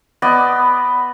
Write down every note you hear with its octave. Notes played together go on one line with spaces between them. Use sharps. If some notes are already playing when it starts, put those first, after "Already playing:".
B3 D5 D#5